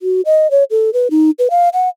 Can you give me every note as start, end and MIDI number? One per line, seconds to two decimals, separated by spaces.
0.01 0.21 66
0.26 0.50 75
0.51 0.64 73
0.71 0.90 69
0.93 1.08 71
1.11 1.31 63
1.39 1.48 71
1.50 1.69 77
1.73 1.89 78